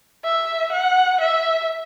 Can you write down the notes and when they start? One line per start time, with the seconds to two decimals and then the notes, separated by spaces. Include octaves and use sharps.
0.24 E5
0.72 F#5
1.20 E5